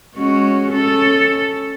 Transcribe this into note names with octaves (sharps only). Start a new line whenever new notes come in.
G#3 C#4 F#4
C#4 A4